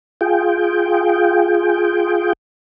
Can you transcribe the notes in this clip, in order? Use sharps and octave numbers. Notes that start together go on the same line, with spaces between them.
F4 G#4 G5